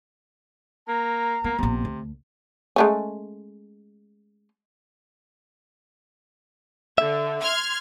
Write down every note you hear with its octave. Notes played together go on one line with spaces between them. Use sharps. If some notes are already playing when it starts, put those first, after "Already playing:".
A#3 A#5
A#3 B3
A#1 C3 B3
D2
G#3 A3 C#4
D3 E5
C6 F6 G#6